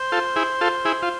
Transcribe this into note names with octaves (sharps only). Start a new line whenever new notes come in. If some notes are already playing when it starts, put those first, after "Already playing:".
Already playing: C5
F4 A4
E4 G#4
F4 A4
E4 G#4
F4